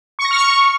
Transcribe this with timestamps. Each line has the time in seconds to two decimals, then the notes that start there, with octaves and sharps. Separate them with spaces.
0.19 C#6
0.25 A#6
0.31 F6
0.37 C#6